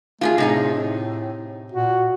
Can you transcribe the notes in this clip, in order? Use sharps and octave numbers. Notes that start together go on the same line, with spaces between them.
A3 F4 G4 G#4
A2 C3 D#4 G#4
A#2 F#4